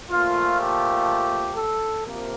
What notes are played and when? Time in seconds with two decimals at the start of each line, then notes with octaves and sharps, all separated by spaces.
0.11 A#2 F3 A3 F4
0.60 G4
1.55 A4
2.04 C3 F3 A#3